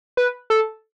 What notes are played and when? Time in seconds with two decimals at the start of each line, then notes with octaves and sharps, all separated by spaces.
0.17 B4
0.50 A4